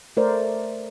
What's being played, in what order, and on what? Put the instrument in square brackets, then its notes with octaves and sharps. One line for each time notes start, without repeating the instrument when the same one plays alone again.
[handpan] A3 A#4 C5 D5